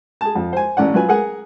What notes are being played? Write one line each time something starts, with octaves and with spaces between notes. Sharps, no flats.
G#4 A5
F2
C5 G#5
A1 C#4 D5 F#5
F#3 F4 B4 G#5
G#4 A#4 F#5 G#5